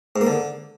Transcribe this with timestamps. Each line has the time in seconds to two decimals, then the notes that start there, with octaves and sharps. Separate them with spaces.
0.16 G#2
0.21 A#3
0.27 D3